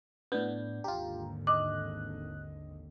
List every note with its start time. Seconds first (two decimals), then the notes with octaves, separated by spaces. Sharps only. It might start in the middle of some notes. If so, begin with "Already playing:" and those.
0.32 A2 B3 D4 G6
0.84 G#1 D#2 D3 F4 G4 A#5
1.47 D#5 D6 D#6 F#6